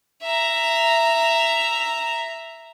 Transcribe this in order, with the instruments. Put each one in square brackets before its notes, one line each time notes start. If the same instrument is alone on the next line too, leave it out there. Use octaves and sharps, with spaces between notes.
[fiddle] E5 A#5